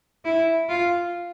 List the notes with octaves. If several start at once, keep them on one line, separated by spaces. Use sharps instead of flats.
E4
F4